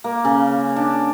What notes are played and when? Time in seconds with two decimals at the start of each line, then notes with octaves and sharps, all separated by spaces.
0.04 A#3
0.24 C#3
0.76 D4